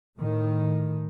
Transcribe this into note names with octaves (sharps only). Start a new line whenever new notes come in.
A2 D#3